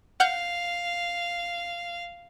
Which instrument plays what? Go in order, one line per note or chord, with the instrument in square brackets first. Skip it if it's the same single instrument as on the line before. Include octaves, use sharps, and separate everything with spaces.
[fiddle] F5 [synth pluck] F#5 F6 G6